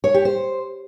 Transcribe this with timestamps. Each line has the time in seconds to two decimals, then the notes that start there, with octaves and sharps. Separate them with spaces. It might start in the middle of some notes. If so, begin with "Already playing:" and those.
0.04 C#5
0.14 G4
0.25 C5